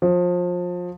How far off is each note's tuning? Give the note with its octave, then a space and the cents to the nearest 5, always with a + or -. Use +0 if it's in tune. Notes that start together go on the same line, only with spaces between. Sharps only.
F3 +25